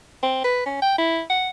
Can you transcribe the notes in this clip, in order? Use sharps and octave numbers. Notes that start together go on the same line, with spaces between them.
C4
B4
C#4
G5
E4
F#5